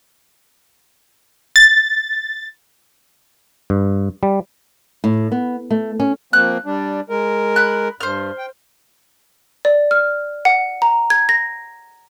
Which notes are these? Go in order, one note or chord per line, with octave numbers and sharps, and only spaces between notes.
A6
G2
G3
A2
B3
A3
C#4
F3 A#3 C4 F#6
G3 D4
G#3 A#4
B5 F#6
G2 C5 F6
G5
D5
F6
F#5
A#5
G#6
A#6